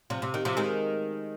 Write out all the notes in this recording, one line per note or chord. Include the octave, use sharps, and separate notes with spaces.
C3 F3
C3
D#3
C3 F3
D#3 G#3